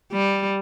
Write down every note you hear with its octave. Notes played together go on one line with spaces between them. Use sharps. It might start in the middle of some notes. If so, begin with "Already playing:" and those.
G3